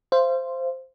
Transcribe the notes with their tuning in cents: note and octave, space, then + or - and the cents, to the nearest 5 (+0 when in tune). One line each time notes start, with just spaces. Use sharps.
C5 +0 F5 -35